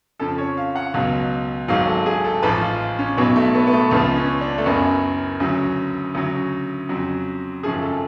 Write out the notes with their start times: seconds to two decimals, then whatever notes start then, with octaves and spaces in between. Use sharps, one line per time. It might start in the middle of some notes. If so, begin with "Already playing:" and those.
0.19 F2 C#3 F3 A4
0.38 C#5
0.57 F5
0.75 F#5
0.94 C#2 B2 F#3 F5
1.68 G#1 G#2 F#3 F5
1.87 A4
2.06 G#4
2.24 A4
2.43 A1 G#2 F3 B4
2.61 F4
2.99 C#4
3.17 B1 B2 F#3 B3
3.36 A3
3.54 B3
3.67 B3
3.73 A3
3.91 C#2 C#3 F3 B3
4.16 C#4
4.41 D4
4.58 A3
4.66 F#1 F#2 C#3 B3
5.40 D2 C#3 F#3
6.15 D2 C#3 F#3
6.89 F2 C#3 F#3
7.63 G#1 F#2 C#3 F3 G#4
7.82 A4